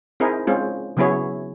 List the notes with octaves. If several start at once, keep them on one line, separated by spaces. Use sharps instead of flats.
C4 D#4 E4 G#4 A#4
G#3 C4 C#4 F4 G#4
C#3 F#3 B3 E4 G#4 C#5